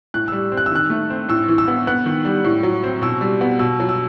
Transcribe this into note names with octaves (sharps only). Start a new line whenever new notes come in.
A2 F#6
G3 E6
C4
F#6
E6
D#3 F#6
A3
C4
A2 E6
E3
E6
B3
B3 F#6
D#3
G3
A2
F#3
C4
B2 E6
G3
B3
B2 E6
F#3
E6